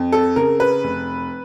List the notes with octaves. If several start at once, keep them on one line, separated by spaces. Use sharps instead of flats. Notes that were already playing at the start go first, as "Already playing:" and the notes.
Already playing: F2
A4
C#3 A#4
B4
F1